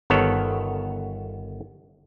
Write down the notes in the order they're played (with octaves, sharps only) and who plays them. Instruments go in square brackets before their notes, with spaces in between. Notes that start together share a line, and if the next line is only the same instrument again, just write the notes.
[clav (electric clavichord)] G1 D#3 B3 A4 C#5